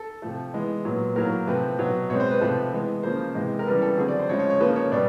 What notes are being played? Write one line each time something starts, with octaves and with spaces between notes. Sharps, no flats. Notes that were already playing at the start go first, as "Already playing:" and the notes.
Already playing: A4
C3 F3 A3
E3 G#3 B3
A#2 F#3 B3
A2 F#3 A#3 A#4
C3 F3 A3 C4 B4
B2 F#3 B3
B2 G#3 C4 C#5
C5
B4
C3 F3 A3
E3 G#3 B3
C#3 F3 A#3 C5
C3 E3 G#3
A#4
C#3 E3 G3 B3 B4
A4
D3 F#3 A3 C4 G#4
D5
C5
C#3 F3 G#3 C#5
C#5
C#5
C#3 F3 A#3 B4
C#5
B2 G3 D5